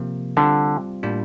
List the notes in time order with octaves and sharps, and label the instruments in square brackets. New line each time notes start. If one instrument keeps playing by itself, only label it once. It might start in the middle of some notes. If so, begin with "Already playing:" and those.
Already playing: [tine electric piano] C3 F3 A#3
[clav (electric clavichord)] D3 [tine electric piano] G3 C4 F4
[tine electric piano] A2 G3 A#3 D4 F4